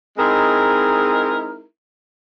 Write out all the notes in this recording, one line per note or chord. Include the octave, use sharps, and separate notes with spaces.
G#3 C4 D#4 E4 G#4 A#4